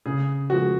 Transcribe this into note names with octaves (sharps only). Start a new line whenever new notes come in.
C#3 G#4
F3 G#3 F#4